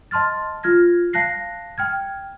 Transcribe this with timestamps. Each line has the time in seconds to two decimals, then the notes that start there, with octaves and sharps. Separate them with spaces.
0.11 D#5 A5 C6 F6 A6
0.63 F4 F6 G#6 A#6
1.13 F5 A5 F#6 A#6 C7
1.78 G5 F6 G#6